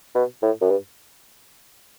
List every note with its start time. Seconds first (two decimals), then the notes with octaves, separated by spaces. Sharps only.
0.15 B2
0.42 A2
0.61 F#2
0.69 G2